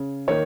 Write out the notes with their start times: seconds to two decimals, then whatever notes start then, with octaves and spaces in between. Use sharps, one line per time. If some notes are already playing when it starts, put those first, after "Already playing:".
Already playing: C#3
0.28 D#3 A#3 C#5